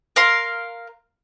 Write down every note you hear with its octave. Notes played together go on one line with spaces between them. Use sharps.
A#4 F5 C6